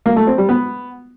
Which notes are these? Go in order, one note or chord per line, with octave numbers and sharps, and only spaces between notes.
A#3
A3
C4
G3
B3